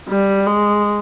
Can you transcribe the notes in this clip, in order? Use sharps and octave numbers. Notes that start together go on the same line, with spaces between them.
G3
G#3